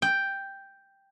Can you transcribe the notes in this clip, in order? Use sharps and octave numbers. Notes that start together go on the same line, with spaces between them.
G5